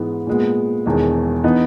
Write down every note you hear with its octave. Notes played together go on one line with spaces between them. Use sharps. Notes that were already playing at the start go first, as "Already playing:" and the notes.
Already playing: G#2 E3 G#3 B3
A#2 G#3 B3
E1 E2 D#3 G#3
E3 B3 D#4